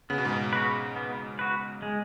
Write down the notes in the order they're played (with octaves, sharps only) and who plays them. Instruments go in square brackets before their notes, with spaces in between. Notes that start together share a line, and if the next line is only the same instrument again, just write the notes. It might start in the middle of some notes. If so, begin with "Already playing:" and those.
[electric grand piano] C#3 [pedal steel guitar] B3
[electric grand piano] B2
G#2
B2
[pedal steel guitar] F#4 B4
B3
F#4 B4
G#3